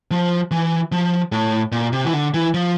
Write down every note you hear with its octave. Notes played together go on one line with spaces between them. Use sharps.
F3
E3
F3
A2
A#2
C3
E3
D3
E3
F3